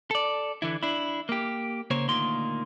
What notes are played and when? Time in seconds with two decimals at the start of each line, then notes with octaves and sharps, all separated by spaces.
0.11 A4 D5
0.62 D3 E3 E4
0.83 D4 E4
1.29 A#3 G4
1.90 C#3 A#3 C5 C#5
2.09 D2 A#2 D#3 A#3 C6